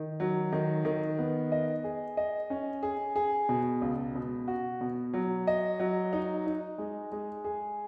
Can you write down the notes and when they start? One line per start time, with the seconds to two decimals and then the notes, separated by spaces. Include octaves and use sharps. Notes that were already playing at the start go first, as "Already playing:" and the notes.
Already playing: D#3
0.20 F#3
0.52 D#3
0.85 D#3
1.19 B3
1.52 D#5
1.84 G#4
2.17 D#5
2.50 C#4
2.83 G#4
3.16 G#4
3.49 B2
3.81 C#2
4.15 B2
4.48 F#4
4.81 B2
5.14 F#3
5.47 D#5
5.80 F#3
6.13 D#4
6.46 D#4
6.78 G#3
7.12 G#3
7.44 G#4